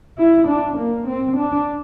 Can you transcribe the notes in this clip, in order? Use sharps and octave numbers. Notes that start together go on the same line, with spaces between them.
E4
D4
A#3
C4
D4